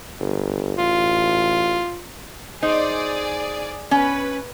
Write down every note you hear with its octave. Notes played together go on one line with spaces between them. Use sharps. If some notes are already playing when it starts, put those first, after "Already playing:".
G1
A1 F4
D#4 G#4 C5 D5
C#4 B4